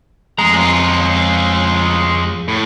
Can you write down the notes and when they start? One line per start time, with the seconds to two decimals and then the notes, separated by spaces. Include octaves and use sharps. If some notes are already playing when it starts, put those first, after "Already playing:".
0.39 F2 G#3 A#5
0.53 G#3 F4
2.48 A2